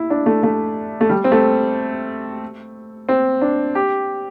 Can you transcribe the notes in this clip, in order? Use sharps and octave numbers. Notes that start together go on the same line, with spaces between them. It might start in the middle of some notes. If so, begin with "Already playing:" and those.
Already playing: E4
D4
A3
A3
A3
G3
C4
A3
C4
D4
G4